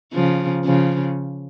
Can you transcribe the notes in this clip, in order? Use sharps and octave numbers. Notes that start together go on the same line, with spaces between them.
C#3 F3
C#3 F3